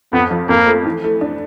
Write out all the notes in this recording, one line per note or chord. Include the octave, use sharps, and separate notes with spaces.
F2 B3
F3
F2 A#3
A3
E3
A3
D4